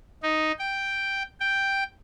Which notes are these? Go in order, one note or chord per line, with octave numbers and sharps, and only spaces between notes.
D#4
G5
G5